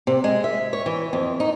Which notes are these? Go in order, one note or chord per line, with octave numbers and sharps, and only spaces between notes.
C3
G#3
E5
C#5
E3
F2
D#4